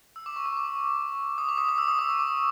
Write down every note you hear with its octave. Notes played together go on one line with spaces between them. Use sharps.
E6
D6
C#6
D6
C#6
D6
D#6
D6
D#6
D#6
E6
D#6
D6
C#6
D6